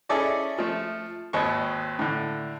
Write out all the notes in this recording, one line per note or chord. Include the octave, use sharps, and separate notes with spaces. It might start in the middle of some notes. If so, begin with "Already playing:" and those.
C#4 E4 G#4 A4 D5 D#5
F3 A3
G#1 D#2 D#5 C#6
A2 D3